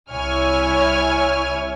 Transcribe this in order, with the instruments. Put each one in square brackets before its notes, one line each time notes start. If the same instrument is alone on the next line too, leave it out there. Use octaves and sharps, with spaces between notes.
[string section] C2 E4 C#5 G#5 F6